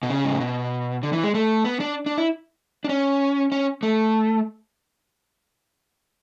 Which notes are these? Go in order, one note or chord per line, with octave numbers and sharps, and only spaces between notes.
B2
C#3
G#2
A2
B2
D3
E3
G#3
A3
B3
D4
D4
E4
D4
C#4
C#4
A3